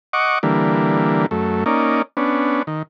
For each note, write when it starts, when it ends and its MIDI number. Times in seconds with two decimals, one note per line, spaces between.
0.13 0.39 75
0.13 0.39 78
0.13 0.39 85
0.13 0.39 86
0.43 1.26 50
0.43 1.26 52
0.43 1.26 55
0.43 1.26 58
1.31 1.64 42
1.31 1.64 57
1.66 2.02 58
1.66 2.02 61
1.66 2.02 63
1.66 2.02 74
2.17 2.63 59
2.17 2.63 61
2.17 2.63 62
2.67 2.82 51